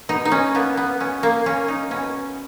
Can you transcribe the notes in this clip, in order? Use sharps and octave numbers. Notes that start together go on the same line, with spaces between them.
B2 D#4
D#4
C#4
A#3 B3
B3
B2 C#4
A#3
A#3 C#4
D#4
B2 C#4